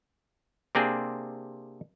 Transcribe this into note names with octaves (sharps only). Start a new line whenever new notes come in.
C3 A#3 C4 D4 G#4